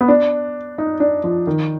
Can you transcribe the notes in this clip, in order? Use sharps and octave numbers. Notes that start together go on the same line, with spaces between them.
B3
D4
D#4
D4
F3
D#3